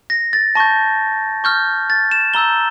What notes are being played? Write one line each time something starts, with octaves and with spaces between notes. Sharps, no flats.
A#6
A6
A5 C#6 G6 A#6
C#6 F6 G6
A6
E7
A#5 E6 G6 G7